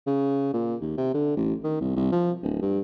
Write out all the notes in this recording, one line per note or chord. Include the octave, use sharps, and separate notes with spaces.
C#3
A#2
D#2
C3
D3
A1
D#3
C2
C2
F3
D1
G2